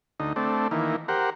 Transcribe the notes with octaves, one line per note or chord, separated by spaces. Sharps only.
D2 D#4
A3 C4 D4
D#3 E3 A#3
G4 A#4 C5 F#5